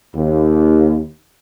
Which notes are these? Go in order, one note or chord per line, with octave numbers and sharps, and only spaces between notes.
D#2